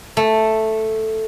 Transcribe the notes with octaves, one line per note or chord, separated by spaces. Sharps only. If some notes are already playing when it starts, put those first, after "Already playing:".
A3